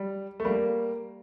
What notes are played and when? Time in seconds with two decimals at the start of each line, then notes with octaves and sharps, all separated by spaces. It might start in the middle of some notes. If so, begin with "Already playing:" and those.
Already playing: G3
0.40 A3
0.45 G3 A#3